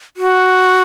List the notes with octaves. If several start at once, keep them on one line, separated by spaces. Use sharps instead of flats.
F#4